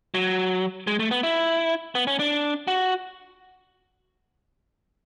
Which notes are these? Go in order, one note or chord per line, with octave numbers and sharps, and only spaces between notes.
F#3
G#3
A3
B3
E4
B3
C#4
D4
F#4